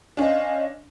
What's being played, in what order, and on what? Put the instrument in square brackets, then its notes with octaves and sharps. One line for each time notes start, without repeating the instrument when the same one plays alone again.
[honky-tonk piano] C#4 D4 [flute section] C5 D#5 F5